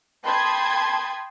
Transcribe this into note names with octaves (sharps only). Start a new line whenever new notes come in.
G5 A5 B5 C6 D#6 G#6